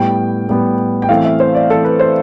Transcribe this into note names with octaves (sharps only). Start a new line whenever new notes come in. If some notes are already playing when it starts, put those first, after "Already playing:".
Already playing: A2 G3 B3 G5
A2 G3 B3
G5
E3 A3 C4 F5
E5
C5
D5
E3 A3 C4 A4
B4
C5